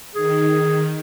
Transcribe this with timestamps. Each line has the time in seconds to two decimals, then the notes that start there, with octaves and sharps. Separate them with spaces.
0.15 D#3 G#4